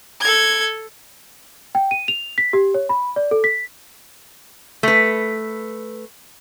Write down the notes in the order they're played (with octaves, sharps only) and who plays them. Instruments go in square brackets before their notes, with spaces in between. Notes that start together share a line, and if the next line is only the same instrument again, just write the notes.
[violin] A4 G#6
[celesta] G5
D#7
F7
B6
G4
C#5
B5
D5
A4
B6
[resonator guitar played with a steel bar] A3 B4